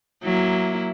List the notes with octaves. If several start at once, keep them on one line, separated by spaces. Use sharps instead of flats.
F#3 A#3 E4